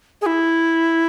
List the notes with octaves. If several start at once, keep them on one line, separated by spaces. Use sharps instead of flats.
G#4
E4